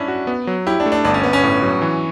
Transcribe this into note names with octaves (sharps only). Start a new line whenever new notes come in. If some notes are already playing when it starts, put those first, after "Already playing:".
Already playing: C#4 D4 E4
F#4
B3
F#3
E4 G4
D4
A3
D4
G1 D4
C#4
G1 B3
C#4
A2
F#3
E3